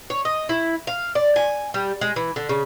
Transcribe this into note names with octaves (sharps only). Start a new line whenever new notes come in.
C#5
D#5
E4
F5
D5
G#5
G3
G#3
E3
D3
C#3